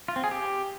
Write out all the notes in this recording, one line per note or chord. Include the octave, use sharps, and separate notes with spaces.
F4
C4
G#4
G4